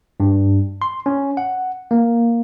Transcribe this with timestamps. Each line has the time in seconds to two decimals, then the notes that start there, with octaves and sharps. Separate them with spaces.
0.20 G2
0.82 C6
1.06 C#4
1.37 F#5
1.91 A#3